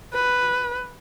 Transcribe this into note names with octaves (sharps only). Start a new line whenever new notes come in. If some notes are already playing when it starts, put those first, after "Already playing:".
B4